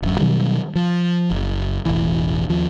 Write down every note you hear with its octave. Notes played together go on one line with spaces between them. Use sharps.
D1 F#2
B2 D#3 F#3 G3
F3
F#1
E1 A1 E3
D#2 F3